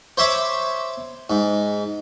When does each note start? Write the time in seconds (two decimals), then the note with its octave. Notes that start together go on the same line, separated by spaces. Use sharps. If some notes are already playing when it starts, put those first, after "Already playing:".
0.17 C5 C#5 E5 B5 D6
1.30 G#2